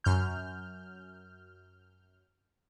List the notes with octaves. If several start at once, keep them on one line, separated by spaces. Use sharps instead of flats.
F#2 F6 G6